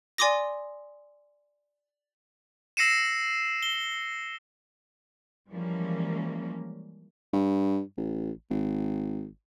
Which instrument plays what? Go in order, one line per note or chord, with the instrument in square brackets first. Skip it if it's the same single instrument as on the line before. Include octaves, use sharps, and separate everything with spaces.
[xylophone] D5 G#5 C6 D6 D#6 A#6
[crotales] E6 A#6 C7 C#7 D#7 E7
G7
[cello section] E3 F3 G3 G#3 A#3 C#4
[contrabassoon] G2
A1
G#1